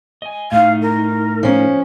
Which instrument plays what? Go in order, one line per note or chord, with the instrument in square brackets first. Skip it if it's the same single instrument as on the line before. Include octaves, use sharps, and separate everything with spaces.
[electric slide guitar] D#5 G#5
[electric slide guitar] A2 D#4 [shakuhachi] F5
[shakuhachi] A#4
[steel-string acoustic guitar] F3 C#4